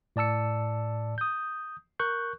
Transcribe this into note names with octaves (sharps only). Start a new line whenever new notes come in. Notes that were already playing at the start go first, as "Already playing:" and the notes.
A2 D5 A5 E6 C#7
D#6 G6
A#4 C#6 F#6 G6